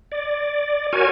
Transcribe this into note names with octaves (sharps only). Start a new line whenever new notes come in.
D5
F#4 A#4 C#5 G#5